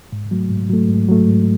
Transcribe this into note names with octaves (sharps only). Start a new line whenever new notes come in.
G#2
F#3 A3
G#2
F#3 A3
G#2
F#3 A3
G#2